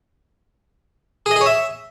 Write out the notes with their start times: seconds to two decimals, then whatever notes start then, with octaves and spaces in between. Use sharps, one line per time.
1.26 G#4
1.31 D#5
1.36 G#4
1.41 C#5
1.46 E5